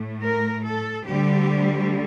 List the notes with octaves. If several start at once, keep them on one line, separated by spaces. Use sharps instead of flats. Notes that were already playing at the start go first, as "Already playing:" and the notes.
Already playing: A2 A3
A#4
A4
D2 D3 G3 G4